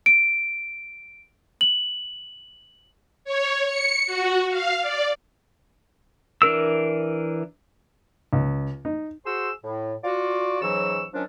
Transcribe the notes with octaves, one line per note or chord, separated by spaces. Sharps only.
D7
F#7
C#5
C#7
F#4
F5
D5
E3 D4 A#4 E6
C#2
D#4
F#4 G#4 C5 C6 E6
A2
F4 F#4 D5
G#2 C#3 E3 F#3 C#6 E6
D#3 F3 F#3 C#4 D4